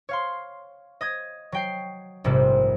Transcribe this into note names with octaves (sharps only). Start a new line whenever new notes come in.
C#5 F5 C6
D#5 D#6 G#6
F#3 G5 C7
A#1 G#2 C3 G3